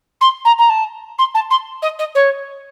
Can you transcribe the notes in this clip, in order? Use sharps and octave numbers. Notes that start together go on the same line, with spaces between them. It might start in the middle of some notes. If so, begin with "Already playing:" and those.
C6
A#5
A#5
A5
C6
A5
C6
D#5
D#5
C#5